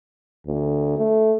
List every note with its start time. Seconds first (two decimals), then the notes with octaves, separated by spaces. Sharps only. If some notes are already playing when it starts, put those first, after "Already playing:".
0.46 D2
0.97 A3